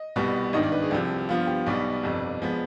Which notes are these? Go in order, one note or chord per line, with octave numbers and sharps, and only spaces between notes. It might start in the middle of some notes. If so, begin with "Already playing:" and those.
Already playing: D#5
C2 B2 G3 B3
G#1 G2 D#3 D#5
D5
B4
G#4
C2 C3 F3 G4
G2 F3 B3 F4
G4
B1 B2 G3 B3 D5
G1 F2 C3
F3 G#3 B3